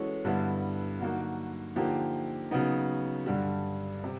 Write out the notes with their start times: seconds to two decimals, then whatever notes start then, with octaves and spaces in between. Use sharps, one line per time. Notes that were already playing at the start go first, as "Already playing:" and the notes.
Already playing: E3 G#3 C#4 F#4 A4
0.25 G2 D3 G3 B3 E4
1.00 D3 F#3 A#3 D#4 F#4
1.76 D3 F3 A#3 D#4 G4
2.51 C#3 F#3 B3 D#4
3.26 G2 D3 G3
4.04 C3